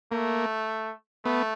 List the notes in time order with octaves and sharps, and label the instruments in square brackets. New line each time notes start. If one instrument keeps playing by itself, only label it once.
[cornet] A3 [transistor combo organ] A#3
[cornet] A3 [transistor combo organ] B3